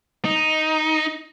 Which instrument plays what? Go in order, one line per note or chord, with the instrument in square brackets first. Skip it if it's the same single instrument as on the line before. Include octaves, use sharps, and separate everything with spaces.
[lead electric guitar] D#4